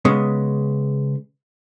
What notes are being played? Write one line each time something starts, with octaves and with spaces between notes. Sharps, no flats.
C#3 G#3 B3